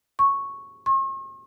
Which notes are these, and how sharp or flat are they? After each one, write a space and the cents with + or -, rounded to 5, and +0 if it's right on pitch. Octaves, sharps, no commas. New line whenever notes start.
C#6 -5
C#6 -45